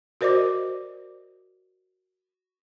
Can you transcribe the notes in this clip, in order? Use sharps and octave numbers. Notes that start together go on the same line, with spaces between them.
F#4 A#4 C5 D5 D#5 D6